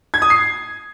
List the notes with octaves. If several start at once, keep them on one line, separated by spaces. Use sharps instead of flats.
G#6
D#6
C7